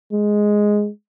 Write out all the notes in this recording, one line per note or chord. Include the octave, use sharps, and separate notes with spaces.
G#3